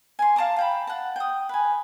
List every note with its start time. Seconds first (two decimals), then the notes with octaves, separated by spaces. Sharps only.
0.19 G#5 C6
0.36 F5 A5 A#5 D6
0.56 F5 G5 B5
0.87 F#5 A5
1.16 G5 D#6
1.49 B4 G#5